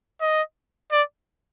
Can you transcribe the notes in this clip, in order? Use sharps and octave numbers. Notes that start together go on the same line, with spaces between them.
D#5
D5